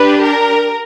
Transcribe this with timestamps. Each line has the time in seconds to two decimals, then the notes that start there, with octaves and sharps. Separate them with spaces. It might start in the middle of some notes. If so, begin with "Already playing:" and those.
Already playing: D4 G4 B4
0.23 A#4